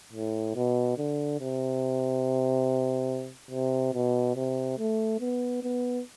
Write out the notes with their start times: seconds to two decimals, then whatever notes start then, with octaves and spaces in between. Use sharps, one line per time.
0.13 A2
0.55 B2
0.98 D3
1.40 C3
3.51 C3
3.94 B2
4.36 C3
4.78 A3
5.20 B3
5.63 B3